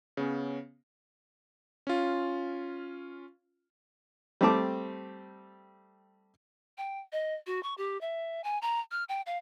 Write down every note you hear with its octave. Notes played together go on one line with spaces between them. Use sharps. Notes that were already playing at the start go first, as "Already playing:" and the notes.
C#3 B3 C#4
C#4 F4
G3 A3 C4 A5 D6
G5
D#5
F#4
C#6
G4
E5
G#5
A#5
F6
G5
F5